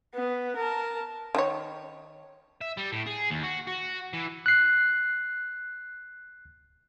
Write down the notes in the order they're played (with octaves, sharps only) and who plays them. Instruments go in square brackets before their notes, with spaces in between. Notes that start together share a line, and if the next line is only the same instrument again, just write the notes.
[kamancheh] B3
A#4 A5
[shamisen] D#3 C#5
[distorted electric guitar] E5
G3
A2
G#4
D#2
F#4
F#4
E3
[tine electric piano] F#6 C7